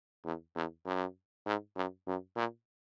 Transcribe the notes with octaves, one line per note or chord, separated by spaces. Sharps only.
E2
E2
F#2
G#2
F#2
F#2
A#2